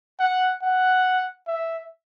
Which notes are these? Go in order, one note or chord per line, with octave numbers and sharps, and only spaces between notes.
F#5
F#5
E5